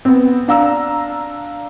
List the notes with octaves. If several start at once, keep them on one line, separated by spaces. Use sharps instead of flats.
B3 C4
D4 F5 A#5 E6